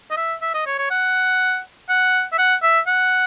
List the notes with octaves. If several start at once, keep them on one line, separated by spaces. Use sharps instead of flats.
D#5
E5
E5
D#5
C#5
C#5
F#5
F#5
E5
F#5
E5
F#5